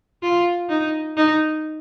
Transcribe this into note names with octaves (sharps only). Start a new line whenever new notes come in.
F4
D#4
D#4